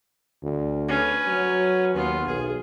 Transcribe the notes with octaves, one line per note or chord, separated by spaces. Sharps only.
D2
C#4 B4
F#3
D#2 B3 F4
B1 G#4